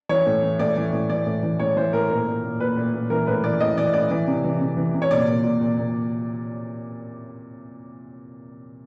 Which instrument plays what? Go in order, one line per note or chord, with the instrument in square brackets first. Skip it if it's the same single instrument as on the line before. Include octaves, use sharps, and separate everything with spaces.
[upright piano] E3 C#5
A2
E3
A2 D5
E3
A2
E3 D5
A2
E3
A2 C#5
E3 C5
A2 A#4
A#2 A#4
A#2
A#2
A#2 B4
A#2
A#2
E3 A#4
A2 B4
E3 D5
A2 D#5
E3 D5
A2 D5
E3
C3
E3
C3
E3
C3
C#5
A#2 D5
A#2
A#2
A#2
A#2